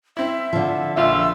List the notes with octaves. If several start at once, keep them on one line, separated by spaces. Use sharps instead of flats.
C4 E4 E5
D3 F3
A#1 D4 F4 E5 E6